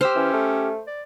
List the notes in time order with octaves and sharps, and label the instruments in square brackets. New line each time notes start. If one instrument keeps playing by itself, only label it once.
[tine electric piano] G4 E6 F6 [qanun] C5
[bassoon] E3 [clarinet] C#4
[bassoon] A3
[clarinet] D5